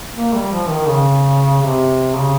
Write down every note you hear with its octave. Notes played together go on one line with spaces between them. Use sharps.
A#3
G3
F3
D#3
C#3
C3
C#3